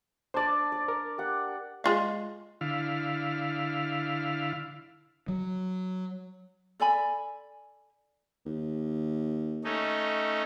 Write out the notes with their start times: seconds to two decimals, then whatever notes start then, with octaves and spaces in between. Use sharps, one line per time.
0.34 D4 C5 D5 A5 D6
0.72 D5
0.88 A#4
1.18 G4 F#5
1.84 G#3 F4 F5
2.61 D3 E4 F5
5.28 F#3
6.80 A4 D5 G#5 B5
8.46 D#2
9.64 A3 C#4 D#4